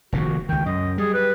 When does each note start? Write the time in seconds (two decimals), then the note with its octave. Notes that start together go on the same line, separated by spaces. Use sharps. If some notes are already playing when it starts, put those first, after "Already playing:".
0.13 F1 A#2 D#3 F#4
0.49 C#2 D#3 G5
0.66 F#2 D#5
0.98 G3 G#4
1.14 B4